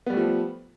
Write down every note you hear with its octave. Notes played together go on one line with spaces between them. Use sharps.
F3 G3 A3 B3